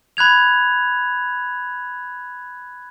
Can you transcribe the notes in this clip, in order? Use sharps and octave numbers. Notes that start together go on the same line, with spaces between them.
B5 F#6 G#6 F7